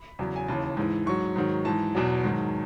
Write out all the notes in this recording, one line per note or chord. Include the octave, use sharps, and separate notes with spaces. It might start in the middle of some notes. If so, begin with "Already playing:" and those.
Already playing: B5
E2 C#3 F#3
G#5
D#2 C#3 E3 A5
G#2 E3
G#2 F#3 C#6
G#2 D#3 F#3
G#2 E3 A5
E2 B2 F#3
G#2 D#3 F#3